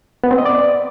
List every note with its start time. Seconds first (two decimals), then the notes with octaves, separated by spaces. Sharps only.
0.24 B3
0.31 C4
0.38 D#5
0.46 D5